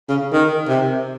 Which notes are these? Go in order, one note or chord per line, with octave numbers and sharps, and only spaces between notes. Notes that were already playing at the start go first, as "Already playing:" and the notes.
C#3
D#3
C3